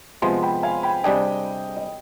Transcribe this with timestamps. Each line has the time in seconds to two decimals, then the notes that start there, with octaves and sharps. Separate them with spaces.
0.22 C3 F3 G#3 B3 G#5 C6
0.43 G5 B5
0.63 F5 G#5
0.83 G5 B5
1.04 C3 G3 D4 G#4 D#5 G5
1.76 D#5